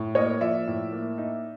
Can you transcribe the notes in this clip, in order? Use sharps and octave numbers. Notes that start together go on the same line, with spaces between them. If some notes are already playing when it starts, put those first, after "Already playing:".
Already playing: A2
A#3 C#5 D#5
F3 D5 E5
A2
A#3
D#4